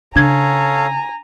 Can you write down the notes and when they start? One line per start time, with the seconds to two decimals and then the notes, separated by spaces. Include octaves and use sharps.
0.16 C#3 D4 A4 C#5 F5 G#5 A#5 G#6